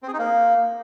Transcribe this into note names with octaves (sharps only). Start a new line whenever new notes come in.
C4
G#4
D#4
A#3